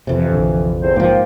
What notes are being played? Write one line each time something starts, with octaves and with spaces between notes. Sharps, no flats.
F2 C3 E3
A#1 D3
E2 C4 C5
G#2 F3 A#3 G5